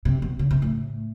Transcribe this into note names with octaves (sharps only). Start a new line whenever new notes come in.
C3
B2
C#3
C3
A2